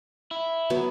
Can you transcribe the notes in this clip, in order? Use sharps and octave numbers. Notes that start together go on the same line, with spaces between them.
E4
F#3 B3 F#4